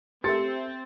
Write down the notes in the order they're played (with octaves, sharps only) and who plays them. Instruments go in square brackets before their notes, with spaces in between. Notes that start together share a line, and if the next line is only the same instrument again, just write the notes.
[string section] C4 [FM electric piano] G4 A4 E5 [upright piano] C6 A6 C#7